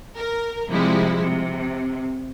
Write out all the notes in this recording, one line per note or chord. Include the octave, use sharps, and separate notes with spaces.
A#4
C3 F3 G3 G#3 E4
C3